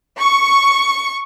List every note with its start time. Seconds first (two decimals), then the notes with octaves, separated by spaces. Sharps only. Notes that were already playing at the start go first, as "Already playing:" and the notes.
0.18 C#6